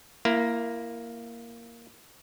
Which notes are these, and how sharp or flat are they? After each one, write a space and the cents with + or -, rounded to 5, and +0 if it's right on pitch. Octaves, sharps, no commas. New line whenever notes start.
A#3 +0 E4 +25